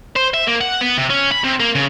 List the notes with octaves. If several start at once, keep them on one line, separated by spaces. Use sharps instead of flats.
C5
E5
A#3
F#5
B3
C3
C#4
B5
C3
A#3
C#3